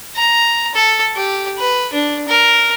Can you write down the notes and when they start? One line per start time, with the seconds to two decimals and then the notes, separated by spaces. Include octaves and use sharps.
0.16 A#5
0.75 A4
1.16 G4
1.59 B4
1.93 D4
2.28 A#4